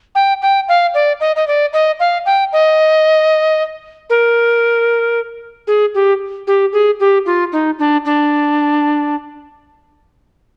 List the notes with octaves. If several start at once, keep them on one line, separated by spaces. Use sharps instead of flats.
G5
G5
F5
D5
D#5
D#5
D5
D#5
F5
G5
D#5
A#4
G#4
G4
G4
G#4
G4
F4
D#4
D4
D4